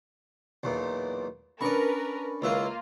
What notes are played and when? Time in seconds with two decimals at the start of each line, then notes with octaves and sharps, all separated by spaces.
0.63 B1 E2 A#2
1.61 C#4 D4 A#4 B4 D5 B5 C#6
2.42 C#2 A#3 E4 F4 B4